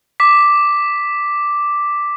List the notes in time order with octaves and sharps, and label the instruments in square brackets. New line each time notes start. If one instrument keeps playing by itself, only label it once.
[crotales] D6 B6